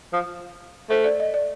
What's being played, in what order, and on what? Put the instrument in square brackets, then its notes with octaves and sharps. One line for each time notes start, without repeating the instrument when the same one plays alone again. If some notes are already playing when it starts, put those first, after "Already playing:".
[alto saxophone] F3
[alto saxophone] A3 [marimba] C5
[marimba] D5
D#5
D5